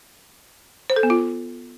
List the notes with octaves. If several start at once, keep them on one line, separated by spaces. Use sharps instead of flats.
C5
A4
B3
F4